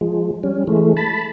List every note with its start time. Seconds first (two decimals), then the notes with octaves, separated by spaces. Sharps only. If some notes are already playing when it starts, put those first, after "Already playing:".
0.01 F3 G#3
0.43 G3 C#4
0.67 E3 G#3 A3
0.97 A5 B5